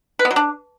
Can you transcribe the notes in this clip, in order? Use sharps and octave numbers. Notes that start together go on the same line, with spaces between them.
B4
B3
F#3
D4